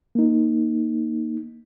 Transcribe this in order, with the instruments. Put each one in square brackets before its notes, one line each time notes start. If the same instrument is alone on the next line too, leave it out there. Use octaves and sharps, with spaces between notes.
[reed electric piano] A#3 D#4